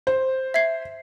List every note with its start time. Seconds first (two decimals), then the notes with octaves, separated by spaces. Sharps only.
0.07 C5
0.54 E5 G#6 C7